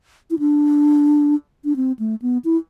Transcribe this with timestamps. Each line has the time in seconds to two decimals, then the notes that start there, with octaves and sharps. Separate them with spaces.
0.31 E4
0.39 D4
1.65 D4
1.76 C4
1.99 A3
2.22 B3
2.45 E4